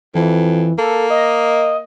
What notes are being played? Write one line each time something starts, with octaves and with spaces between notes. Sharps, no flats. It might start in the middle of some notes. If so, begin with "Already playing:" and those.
F2 E3
A#3 A4
D#5